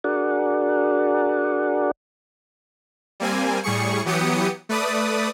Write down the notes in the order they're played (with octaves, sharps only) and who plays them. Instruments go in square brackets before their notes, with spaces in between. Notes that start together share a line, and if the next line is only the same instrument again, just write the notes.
[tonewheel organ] D4 F#4 G#4 A#4 D5 F#5
[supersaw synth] G3 A#3 C4 G#5
A2 G3 G#4 C#6 C#7
E3 F#3 B3 G4 D#6 C#7
A3 B4 D5 D#6